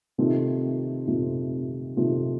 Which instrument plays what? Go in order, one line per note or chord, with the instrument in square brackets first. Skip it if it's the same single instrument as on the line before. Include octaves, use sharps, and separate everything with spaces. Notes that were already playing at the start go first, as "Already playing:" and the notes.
[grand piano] C3 D#3 A3 C4 F4
C3 D#3 A3 C4 F4
C3 D#3 A3 C4 F4